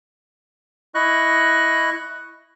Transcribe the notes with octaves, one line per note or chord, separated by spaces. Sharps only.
E4 D#5 C#6 F#6